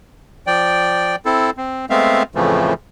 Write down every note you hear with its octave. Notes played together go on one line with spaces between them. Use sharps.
F3 D5 G5
C4 E4 A4
C4
G#3 A3 B3 C4 E5 F5
F2 A2 C#3 E3 F3 A3